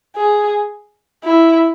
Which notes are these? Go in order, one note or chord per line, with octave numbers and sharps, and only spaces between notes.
G#4
E4